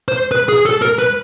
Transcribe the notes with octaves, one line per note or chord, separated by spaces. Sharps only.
C5
B4
G#4
A4
A#4
B4